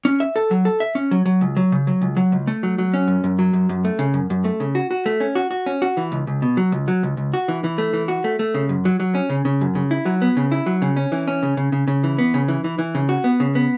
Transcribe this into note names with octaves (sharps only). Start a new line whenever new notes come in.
C#4
E5
A4
F#3
A4
E5
C#4
F#3
F#3
C#2
F#3
C#3
F#3
C#2
F#3
C#2
A3
F#3
F#3
C#4
F#2
F#2
F#3
F#2
F#2
A3
C#3
F#2
F#2
A3
C#3
F#4
F#4
A3
C#4
F#4
F#4
C#4
F#4
E3
C#2
C#2
B2
F#3
C#2
F#3
C#2
C#2
F#4
E3
E3
A3
E3
F#4
A3
A3
C#3
F#2
F#3
F#3
C#4
C#3
C#3
F#2
C#3
E4
F#3
B3
C#3
E4
F#3
C#3
C#4
E3
C#4
C#3
C#3
C#3
C#3
E3
B3
C#3
E3
E3
E3
C#3
F#4
B3
C#3
B3